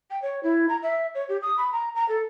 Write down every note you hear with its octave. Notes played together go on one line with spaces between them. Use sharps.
G5
C#5
E4
A#5
E5
C#5
G4
D#6
B5
A#5
A#5
A4